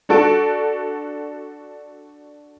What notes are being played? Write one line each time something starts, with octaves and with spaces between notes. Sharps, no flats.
D4 F#4 A4 A5 D7